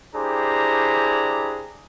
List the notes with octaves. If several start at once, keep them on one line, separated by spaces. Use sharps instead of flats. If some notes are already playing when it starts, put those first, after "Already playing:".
D4 E4 G4 G#4 C5 A#5